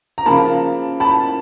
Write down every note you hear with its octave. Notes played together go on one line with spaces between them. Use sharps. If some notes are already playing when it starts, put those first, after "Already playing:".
A#5
C#3 F3 A#3 A5 B5
A5 B5